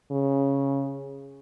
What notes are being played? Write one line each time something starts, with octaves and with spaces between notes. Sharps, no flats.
C#3